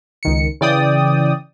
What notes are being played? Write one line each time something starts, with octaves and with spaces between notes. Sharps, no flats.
C#2 D#3 C#7
C#3 E3 D5 G5 D#6